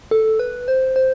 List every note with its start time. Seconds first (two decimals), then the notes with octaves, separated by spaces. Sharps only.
0.11 A4
0.39 B4
0.68 C5
0.96 C5